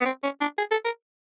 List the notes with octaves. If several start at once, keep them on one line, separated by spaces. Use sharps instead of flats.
B3
C4
C#4
D4
G#4
A4
A#4